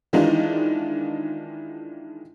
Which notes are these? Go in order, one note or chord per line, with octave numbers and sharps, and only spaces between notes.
D#3 E3 G#3 D4 D#4 F4